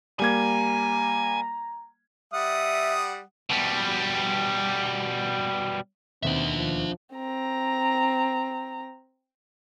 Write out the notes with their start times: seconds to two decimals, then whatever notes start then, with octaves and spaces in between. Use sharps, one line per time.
0.20 G3 A#3 G#5 A#5 G#6
2.34 G3 E5 F#5 D#6
3.50 B2 G3
6.23 D#2 B2 C4 D4 E5
6.56 F3
7.15 C4 A#5